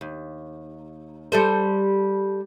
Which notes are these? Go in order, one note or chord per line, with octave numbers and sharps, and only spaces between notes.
D#2
G3 A4 C5